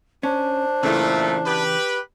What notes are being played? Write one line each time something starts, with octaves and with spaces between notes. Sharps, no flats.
C#4 D4 C5
A#2 C#3 E3 A3 E4
G4 B4